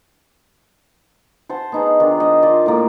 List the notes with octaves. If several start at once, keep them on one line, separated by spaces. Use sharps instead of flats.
C5 F#5 A5
B3 D#4 G#4
D#3 D4 F4
C5 D#5
F4 D5
A2 A#3